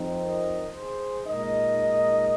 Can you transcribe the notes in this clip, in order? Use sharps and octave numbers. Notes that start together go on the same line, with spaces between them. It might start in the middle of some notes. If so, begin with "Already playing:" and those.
Already playing: F2 F3 C4 D#4
A#4 D#5
G#4 C5
A#2 G#3 D#4 A#4 D#5